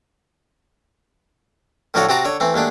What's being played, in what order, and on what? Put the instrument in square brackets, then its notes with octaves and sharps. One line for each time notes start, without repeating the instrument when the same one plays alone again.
[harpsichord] A2 D3 F3 F#4 A4 C#5
C3 C4 F#4 A5 A#5 D6
D3 C#5
E3 A3 C4
D#2 G#3 A3 D4